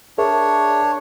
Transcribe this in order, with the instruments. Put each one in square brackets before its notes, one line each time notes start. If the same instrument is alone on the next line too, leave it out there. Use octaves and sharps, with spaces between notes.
[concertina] D4 C#5 [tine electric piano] G#4 A#4 E5